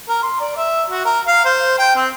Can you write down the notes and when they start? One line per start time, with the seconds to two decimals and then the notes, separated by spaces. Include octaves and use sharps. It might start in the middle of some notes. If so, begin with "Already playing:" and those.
0.09 A#4
0.23 C6
0.40 D5
0.56 E5
0.90 F#4
1.05 A#4
1.27 F5
1.45 C5
1.79 G5
1.96 C4